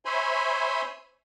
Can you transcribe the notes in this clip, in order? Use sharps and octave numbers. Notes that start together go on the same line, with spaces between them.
C5 C#5 E5 G#5 B5 C6